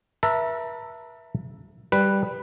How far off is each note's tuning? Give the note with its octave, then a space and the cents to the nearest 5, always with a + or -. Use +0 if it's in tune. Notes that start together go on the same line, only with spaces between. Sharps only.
B4 -45 E5 +0 A5 +35
G3 +5 B4 +0